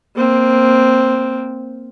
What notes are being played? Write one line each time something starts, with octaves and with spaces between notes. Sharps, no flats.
A#3 C4